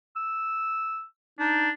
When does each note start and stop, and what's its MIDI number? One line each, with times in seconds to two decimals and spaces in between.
0.16 1.04 88
1.39 1.70 62
1.39 1.70 63